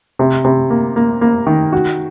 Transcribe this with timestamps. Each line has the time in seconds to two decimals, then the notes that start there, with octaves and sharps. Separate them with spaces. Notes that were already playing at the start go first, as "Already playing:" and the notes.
0.19 C3
0.45 C3
0.70 A#3
0.96 A#3
1.21 A#3
1.47 D#3
1.72 F#4